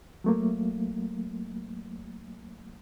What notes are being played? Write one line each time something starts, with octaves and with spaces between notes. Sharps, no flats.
F#3 A3 A#3